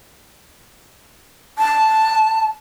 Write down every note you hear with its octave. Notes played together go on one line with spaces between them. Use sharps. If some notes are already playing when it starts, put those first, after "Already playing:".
A5